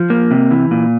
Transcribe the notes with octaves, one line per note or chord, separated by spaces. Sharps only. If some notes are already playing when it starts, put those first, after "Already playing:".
Already playing: F3
A#3
C3
E3
A#2